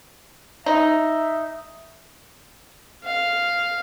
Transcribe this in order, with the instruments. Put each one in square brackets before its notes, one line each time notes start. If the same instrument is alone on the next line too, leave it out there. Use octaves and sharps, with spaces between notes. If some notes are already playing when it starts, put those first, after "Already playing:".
[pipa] D#4 [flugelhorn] E5 [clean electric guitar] A#5
[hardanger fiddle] F5